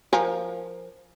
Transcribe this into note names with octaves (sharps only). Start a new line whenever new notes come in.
F3 A#4 G#5